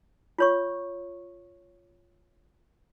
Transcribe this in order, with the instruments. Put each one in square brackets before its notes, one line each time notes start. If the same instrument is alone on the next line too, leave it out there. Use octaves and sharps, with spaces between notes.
[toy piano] F4 C#5 C#6